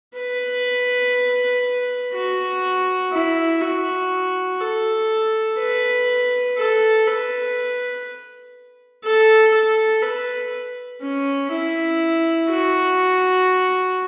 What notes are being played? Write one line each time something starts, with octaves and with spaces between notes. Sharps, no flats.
B4
F#4
E4
F#4
A4
B4
A4
B4
A4
A4
B4
C#4
E4
F#4